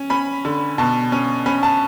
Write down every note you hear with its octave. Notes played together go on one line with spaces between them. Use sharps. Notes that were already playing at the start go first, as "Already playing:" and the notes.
Already playing: C#4
C#4 B5
D3
B2 A5
C#4
C#4 B5
A5